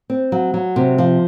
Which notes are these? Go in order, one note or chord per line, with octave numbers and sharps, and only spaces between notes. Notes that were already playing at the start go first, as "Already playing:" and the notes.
C4
F#3
F#3
C3
F3